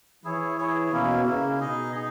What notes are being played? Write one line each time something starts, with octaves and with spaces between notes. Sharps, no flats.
E3 E4 G#4 C#5
E4 G#4 C#5
B2 A#3 C#4 E4
C#3 A#3 C#4 E4
B2 D#4 G#4 D#5
D#4 G#4